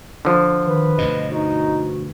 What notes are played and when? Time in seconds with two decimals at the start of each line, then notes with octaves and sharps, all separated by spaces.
0.25 D3 F3
0.67 D#3 B4
0.98 D2 G2 B2 D#5
1.32 D#4 F#4